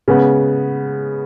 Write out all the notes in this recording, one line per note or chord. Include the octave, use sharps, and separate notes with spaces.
C#3 G#3 B3